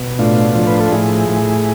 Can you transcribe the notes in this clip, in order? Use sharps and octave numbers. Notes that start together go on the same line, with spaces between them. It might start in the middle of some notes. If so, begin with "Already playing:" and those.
Already playing: B2
A2 D4 F4
F3
B4
A4
A2 E4 G#4
A2